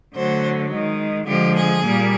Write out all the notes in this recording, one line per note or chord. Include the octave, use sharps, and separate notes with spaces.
D3 F#3 A3 C5
D#3 G#3
D3 F3 G#3 G4
G#4
A#2 G3 A#3